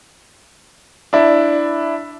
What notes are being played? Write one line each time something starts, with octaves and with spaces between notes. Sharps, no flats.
D4 E4